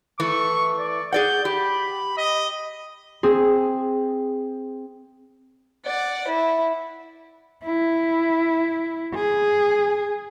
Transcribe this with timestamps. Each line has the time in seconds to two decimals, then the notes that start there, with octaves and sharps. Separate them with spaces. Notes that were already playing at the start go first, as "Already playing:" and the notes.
0.20 E3 A3 E4 C#6
0.78 D5
1.12 G#4 D5 F#5 G6
1.45 G4 B5
2.17 D#5
3.23 C4 G#4
5.85 D5 F#5
6.28 E4
7.65 E4
9.15 G#4